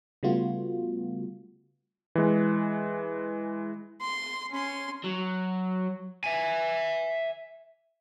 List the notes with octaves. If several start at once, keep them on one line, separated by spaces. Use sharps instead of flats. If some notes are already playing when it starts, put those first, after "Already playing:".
C#3 G3 A3 B3 F4 F#4
E3 G#3
C6
C#4 C6
F#3
E5 G#5